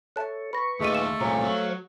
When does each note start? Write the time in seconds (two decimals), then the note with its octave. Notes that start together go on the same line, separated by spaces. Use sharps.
0.16 A4 C#5 E5 A5 F#6
0.53 B4 B5 C#6 A#6
0.80 D#2 A3 F4 G#4 D#5 D#7
0.95 E7
1.21 C2 A#2 C5 C#5 F5 A#5
1.44 F#3